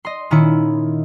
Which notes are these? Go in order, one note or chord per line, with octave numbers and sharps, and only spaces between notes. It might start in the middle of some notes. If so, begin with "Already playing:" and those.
D#5 C6
A#2 D#3 C#4 E4 C#7